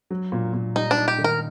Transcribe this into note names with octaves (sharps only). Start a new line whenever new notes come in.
F#3
A#2
A#2
G3 D#4
D4
D#4
G4
D#3
A#4